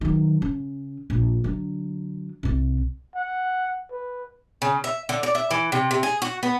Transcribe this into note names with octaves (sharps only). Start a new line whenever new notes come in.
D#3 F#3
C#3
A#1
D3 F#3
C2 C3
F#5
B4
C#3
E5
D3
D5
E5
E3
C3
C3
G#4
F#4
B3